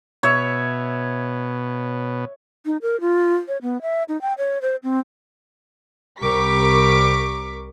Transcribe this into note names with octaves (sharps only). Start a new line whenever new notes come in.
B2 C#5 E5
D#4
A#4
F4
C#5
B3
E5
D#4
G5
C#5
C5
C4
C2 G3 A#4 C#6 D6 B6